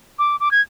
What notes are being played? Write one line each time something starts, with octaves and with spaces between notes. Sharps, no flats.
D6
D6
G#6